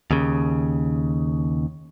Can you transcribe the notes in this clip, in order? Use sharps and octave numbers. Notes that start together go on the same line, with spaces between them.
D#2 C#3